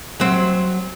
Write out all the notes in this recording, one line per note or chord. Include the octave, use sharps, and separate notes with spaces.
F#3 C4